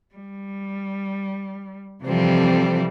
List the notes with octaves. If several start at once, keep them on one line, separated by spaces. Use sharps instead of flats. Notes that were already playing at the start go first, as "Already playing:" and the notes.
G3
C3 E3 F3 G3 C4 A4